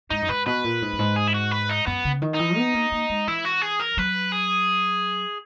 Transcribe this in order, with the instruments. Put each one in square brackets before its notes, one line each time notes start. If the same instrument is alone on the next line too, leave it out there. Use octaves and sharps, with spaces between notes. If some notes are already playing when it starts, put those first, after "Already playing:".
[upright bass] G#2 [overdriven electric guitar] D#4
[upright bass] F#2
[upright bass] G#2 [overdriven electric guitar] B4
[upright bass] B2 [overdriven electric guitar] B4
[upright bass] A#2
G#2
F#2
G#2
[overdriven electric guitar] G#4
E4
F#4
B4
D#4
[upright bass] F#2 [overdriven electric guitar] B3
[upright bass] C#3
D#3
[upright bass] E3 [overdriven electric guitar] D#4
[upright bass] B3
A#3
A#3
G#3
[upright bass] E3 [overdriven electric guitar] E4
[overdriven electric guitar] F#4
G#4
A#4
[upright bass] F#3 [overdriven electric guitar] B4
[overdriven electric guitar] G#4